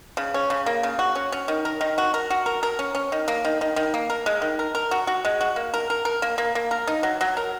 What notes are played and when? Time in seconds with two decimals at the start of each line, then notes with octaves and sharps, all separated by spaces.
0.17 C#3
0.34 C#4
0.50 C#3
0.66 A#3
0.83 C#3
0.99 F#4
1.15 C#4
1.32 C#4
1.48 D#3
1.65 A#4
1.81 D#3
1.98 F#4
2.14 A#4
2.30 F#4
2.46 A#4
2.63 A#4
2.79 C#4
2.95 C#4
3.12 D#3
3.28 A#3
3.45 D#3
3.61 D#3
3.76 D#3
3.94 A#3
4.10 A#4
4.26 G#3
4.42 D#3
4.59 A#4
4.75 A#4
4.91 F#4
5.07 F#4
5.25 G#3
5.41 F#4
5.56 A#3
5.74 A#4
5.90 A#4
6.05 A#4
6.22 A#3
6.38 A#3
6.55 A#3
6.71 A#4
6.87 D#4
7.03 F#3
7.21 F#3
7.37 A#4